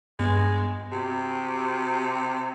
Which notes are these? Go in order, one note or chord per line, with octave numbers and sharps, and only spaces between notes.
G2 G#3 B3
C3 F#4 G4